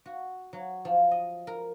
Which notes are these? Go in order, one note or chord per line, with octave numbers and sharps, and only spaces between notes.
F#4
F#3
F3
D#5
A#4